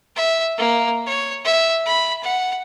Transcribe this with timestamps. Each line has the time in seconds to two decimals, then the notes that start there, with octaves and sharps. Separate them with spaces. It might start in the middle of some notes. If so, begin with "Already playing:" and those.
0.16 E5
0.58 A#3
1.06 C#5
1.45 E5
1.86 B5
2.23 F#5